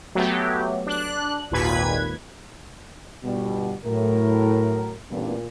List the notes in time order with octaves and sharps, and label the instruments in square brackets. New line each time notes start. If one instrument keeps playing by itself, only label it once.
[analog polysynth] F#3 A3 B3 G4
D4 F#6
G#1 D#2 A#2 B4 G#6 B6
[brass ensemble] G1 B2 [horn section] G3
[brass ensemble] A2 [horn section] F#3 A#4
[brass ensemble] A1 G2 B3 [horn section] A#2